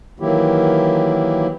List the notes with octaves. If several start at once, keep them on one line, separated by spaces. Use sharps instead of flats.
D#3 E3 F#3 A#3 E4 G4